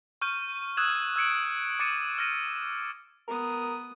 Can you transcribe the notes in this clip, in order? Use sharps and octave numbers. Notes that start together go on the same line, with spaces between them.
C#6 F6 G6 D#7
D#6 E6 F#6 G#6 E7 F#7
E6 G#6 C#7 D7
D6 A6 C#7 D#7
F6 A#6 D#7
B3 A#4 D#6